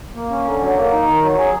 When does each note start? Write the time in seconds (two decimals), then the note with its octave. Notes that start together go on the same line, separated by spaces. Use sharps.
0.15 A#3
0.30 C#4
0.45 D3
0.61 F#3
0.77 A#3
0.92 D#4
1.07 D#3
1.22 F#3
1.38 G#4